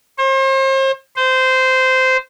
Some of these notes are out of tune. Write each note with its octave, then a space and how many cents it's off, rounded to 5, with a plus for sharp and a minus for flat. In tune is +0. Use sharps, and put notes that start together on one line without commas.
C5 +40
C5 -15